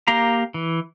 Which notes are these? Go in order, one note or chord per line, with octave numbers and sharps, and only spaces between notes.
A#3 G4 F5 A#5
E3